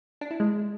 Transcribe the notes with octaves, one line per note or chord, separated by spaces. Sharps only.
D4
E4
G#3